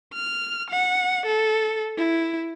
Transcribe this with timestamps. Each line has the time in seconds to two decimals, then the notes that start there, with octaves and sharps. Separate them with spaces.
0.14 F6
0.70 F#5
1.26 A4
1.98 E4